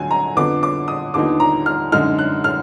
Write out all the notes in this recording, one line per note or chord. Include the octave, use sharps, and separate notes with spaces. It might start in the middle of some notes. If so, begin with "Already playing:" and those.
Already playing: D2 D3 F#3 G#5
A#5
F2 D3 F3 B3 D6
D6
D#6
D#2 D3 F3 B3 D#4 D6
A#5
F6
F#2 D3 G#3 D#4 F6
F#6
F6